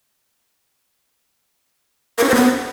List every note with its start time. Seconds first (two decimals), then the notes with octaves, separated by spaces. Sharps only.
2.18 A#4
2.24 C#4
2.29 C5
2.35 B3